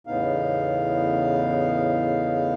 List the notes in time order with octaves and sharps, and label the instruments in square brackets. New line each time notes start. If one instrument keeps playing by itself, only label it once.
[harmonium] E2 A2 C#3 B3 D#4 F5